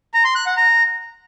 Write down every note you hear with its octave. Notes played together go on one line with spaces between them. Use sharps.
A#5
C6
F#6
F#5
A#5